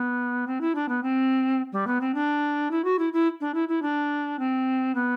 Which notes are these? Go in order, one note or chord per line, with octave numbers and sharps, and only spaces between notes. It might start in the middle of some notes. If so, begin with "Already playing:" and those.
Already playing: B3
C4
E4
D4
B3
C4
G3
B3
C4
D4
E4
F#4
E4
E4
D4
E4
E4
D4
C4
B3